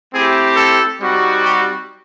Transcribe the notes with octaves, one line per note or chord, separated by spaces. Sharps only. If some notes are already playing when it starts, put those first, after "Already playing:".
A3 C4 E4 G4 G#4
A4
G3 C4 D#4 F#4
G4